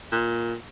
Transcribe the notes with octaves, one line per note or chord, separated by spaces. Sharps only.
A#2